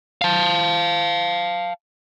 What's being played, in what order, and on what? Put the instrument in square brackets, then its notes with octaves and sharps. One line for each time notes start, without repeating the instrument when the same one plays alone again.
[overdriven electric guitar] F5 A5